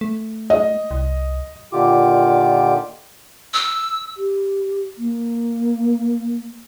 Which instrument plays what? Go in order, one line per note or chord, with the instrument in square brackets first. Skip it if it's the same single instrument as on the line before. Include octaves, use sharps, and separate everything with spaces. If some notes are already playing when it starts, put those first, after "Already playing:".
[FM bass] A3
[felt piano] D#5
[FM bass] C2
[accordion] A#2 D3 D#3 F4 G4 D6
[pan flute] E6
[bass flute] G4
A#3